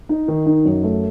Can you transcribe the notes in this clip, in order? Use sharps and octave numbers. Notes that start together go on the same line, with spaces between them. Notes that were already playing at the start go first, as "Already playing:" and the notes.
D#4
D#3
D#4
F#2
A3